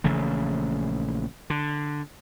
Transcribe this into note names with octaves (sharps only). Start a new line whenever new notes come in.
A#1 C#3 E3 A3
D3